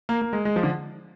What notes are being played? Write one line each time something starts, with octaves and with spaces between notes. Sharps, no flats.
A#3
A#3
G#3
G#3
F3
D3